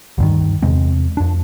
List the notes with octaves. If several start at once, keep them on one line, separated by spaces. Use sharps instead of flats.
D2 G2 D#3
E2 C3 G#3 C4
F2 D4